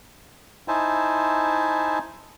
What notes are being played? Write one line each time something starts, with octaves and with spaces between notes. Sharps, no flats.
D#4 E4 C5 E5 G#5 A5